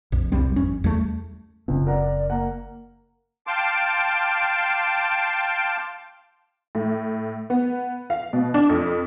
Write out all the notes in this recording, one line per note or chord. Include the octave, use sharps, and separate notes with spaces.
A#1 F2
C2 G3 C4
G#1 F2 C#4
E2 G3 A3
F#1 C#2 C#3 C4
A#4 D5 F#5 A#5
A#3 F#5 A#5
F5 G5 A5 C6 D6
A2
B3
F5
B2
D4
F2